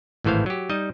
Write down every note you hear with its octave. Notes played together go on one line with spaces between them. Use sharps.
G#1 A2 E3 C5 F5
F#3 G4
G3 D#4 D#5